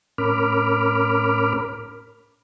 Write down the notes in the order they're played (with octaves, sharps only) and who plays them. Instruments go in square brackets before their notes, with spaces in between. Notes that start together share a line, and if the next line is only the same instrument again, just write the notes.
[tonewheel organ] A2 C#4 A#4 B5 D6 F6